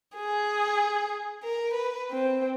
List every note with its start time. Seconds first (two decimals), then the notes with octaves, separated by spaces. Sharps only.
0.16 G#4
1.44 A#4
1.74 B4
2.11 C4